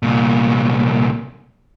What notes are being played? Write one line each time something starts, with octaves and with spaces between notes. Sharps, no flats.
C2 A#2